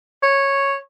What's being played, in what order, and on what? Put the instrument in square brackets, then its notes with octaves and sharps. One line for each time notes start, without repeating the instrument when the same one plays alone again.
[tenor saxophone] C#5